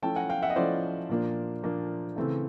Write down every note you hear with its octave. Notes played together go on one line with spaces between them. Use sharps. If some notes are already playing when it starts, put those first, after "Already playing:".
F3 A3 C#4 E4 G5 A5
F#5 G#5
F5 G5
E5 F#5
D#5
F3 A3 C#4 E4 C5 D5
A#2 F3 A#3 D4
A#2 F3 A#3 D4
C#3 E3 A3 C4 E4